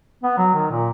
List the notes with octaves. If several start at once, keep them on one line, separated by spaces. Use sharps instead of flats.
B3
F#3
D#3
A#2